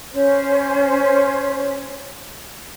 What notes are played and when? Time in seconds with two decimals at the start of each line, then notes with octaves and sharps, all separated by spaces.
0.12 C#4 C5